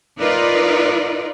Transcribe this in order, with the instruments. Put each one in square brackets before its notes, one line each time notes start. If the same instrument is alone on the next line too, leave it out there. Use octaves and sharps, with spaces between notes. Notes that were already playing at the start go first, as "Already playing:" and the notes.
[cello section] D#4 F4 A#4 B4 D5 D#5